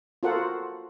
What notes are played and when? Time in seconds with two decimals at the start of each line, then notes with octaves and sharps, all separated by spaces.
0.23 F4 F#4 A4 A#4 C5 F#5